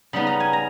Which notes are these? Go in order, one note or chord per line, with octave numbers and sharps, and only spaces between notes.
C#3 G3 B3 D#4 B5
A#5
G#5
A#5